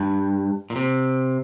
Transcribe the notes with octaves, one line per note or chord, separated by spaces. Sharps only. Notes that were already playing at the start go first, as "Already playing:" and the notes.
Already playing: G2
A#2
C3